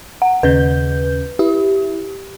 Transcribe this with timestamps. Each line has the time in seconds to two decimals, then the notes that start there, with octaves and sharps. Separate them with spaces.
0.22 F#5
0.43 D#2 C#3 B4 G6
1.39 E4 G4